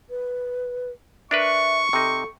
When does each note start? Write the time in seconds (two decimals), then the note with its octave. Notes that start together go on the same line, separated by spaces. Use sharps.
0.10 B4
1.31 D4 A#4 B4 E5 C#6
1.93 C3 D#4 A4